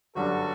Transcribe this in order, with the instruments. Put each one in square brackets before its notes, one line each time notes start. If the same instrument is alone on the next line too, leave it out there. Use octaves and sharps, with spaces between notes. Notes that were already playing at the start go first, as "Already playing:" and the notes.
[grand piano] G1 F#2 D3 G3 [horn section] F#4 A4